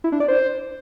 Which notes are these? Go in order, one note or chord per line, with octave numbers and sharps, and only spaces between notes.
E4
D4
D5
C5